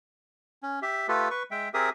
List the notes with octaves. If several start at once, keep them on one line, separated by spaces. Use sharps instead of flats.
C#4
G4 E5
A3 F4 G4 A4 B4
B4 C#6
G#3 E5 G5
C4 G4 G#4 A#4 E5 D#6